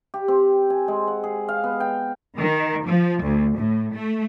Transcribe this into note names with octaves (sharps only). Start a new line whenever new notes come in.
G4
C4
G#5
G#3
F#5
G#4
F5
B3
G5
D#3
F3
D2
A2
A3